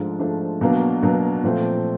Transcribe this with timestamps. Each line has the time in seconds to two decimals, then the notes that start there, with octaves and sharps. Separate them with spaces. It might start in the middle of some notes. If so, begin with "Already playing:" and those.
Already playing: G#2 F3 A3 D4
0.19 G#2 F3 A3 D4
0.61 B2 F#3 A#3 D4
1.02 B2 F#3 A#3 D4
1.43 A#2 F3 A3 C4